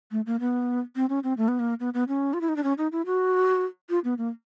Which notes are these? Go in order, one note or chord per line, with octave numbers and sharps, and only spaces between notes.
A3
A#3
B3
C4
C#4
C4
A3
B3
A#3
B3
B3
C#4
F4
E4
D#4
D4
C#4
D#4
E4
F#4
F4
B3
A#3